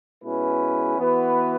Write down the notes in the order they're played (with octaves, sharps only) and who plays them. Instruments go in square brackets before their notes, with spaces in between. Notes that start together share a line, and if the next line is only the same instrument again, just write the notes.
[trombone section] B2 G#3 C#4 E4 B4
E3 B3 F#4 B4